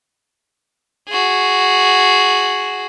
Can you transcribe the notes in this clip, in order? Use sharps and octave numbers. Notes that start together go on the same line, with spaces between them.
F#4 G#4